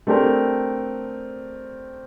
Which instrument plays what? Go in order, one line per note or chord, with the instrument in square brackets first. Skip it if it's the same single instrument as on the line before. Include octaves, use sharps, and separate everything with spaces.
[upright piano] A3 C4 D4 G4 A#4